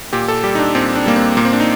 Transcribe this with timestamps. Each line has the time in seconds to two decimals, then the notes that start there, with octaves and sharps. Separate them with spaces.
0.13 A#2 G4
0.28 A4
0.43 G3 G4
0.55 D#4
0.59 D4
0.75 A#2 C4
0.96 D4
1.06 G3 A#3
1.16 C4
1.37 A#2 A#3
1.45 C4
1.53 D4
1.60 D#4